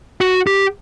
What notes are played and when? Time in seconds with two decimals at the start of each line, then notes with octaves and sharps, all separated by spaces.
0.21 F#4
0.47 G4